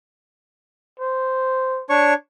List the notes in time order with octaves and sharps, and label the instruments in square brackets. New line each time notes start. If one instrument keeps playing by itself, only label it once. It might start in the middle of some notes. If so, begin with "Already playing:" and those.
[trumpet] C5
[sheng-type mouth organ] D4 C#5 C#6